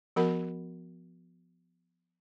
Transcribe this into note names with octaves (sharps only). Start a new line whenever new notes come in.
F3 B3 F#4 A#4 F#5 B5